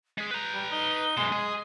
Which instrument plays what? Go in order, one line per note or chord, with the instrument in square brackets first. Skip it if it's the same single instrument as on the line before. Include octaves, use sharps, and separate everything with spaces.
[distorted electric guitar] G#3 G#4 [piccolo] B6
[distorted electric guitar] B4 A#5 [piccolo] G6
[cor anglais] G3
[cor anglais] D#4 [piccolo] G7
[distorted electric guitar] F#2 B2 [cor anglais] G#3
[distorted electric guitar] G#4 [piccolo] D#5